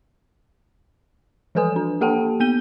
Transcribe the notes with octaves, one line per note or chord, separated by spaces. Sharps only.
E3 F3 A4 B4 G#5 D#6
D4
A#3 G4 A4 F#5 G5 A5
B3 G6 D#7 G7